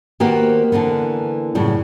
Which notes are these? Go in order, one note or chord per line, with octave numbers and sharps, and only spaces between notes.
D#3 A#3 B3 F#4 G4 C5
D3 E3 A#3 B3
F#2 A2 C#3 G3